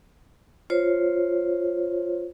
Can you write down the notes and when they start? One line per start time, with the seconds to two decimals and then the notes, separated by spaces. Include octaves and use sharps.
0.70 F4 C5 C#5